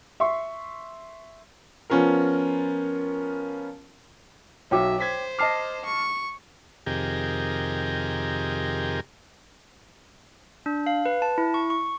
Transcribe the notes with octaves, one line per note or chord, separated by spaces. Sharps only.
E5 C6 C#6
F3 B3 C#4 F4 A#4
B1 F#3 C#5 E5 G5 D6
C5 G#6 B6
D#5 A5 D6 F6 C7
C#6
F2 C3 D#3 G4 G#4 A#4
D4
F5
B4
A5
E4
C#6
C#6